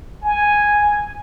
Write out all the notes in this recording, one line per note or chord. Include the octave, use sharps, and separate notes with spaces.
G#5